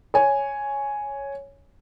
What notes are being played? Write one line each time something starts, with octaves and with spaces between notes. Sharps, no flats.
C#5 G#5